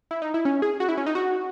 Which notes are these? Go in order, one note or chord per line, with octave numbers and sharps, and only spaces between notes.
E4
D#4
E4
C#4
G#4
F#4
E4
C#4
D#4
F#4